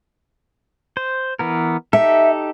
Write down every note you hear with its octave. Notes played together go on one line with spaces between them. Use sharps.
C5
E3 B3 A#4
D#4 G4 A4 E5